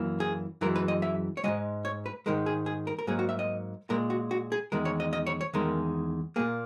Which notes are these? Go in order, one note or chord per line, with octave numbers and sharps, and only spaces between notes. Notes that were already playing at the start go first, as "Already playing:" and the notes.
Already playing: F#2 E3 A#3
G#4
F#2 E3 G#3 A#4
B4
D#5
E5
C#5
G#2 E3 G#3 D#5
C#5
B4
G#2 D#3 G#3 A#4
G#4
G#4
A#4
A#4
G#2 F#3 A#3 G#4
F#4
E5
D#5
A#2 G#3 A#4
F#4
F#4
G#4
E2 D#3 G#3 A#4
C#5
D#5
D#5
C#5
C#5
E2 D#3 G#3 A#4
A#2 A#3 G#4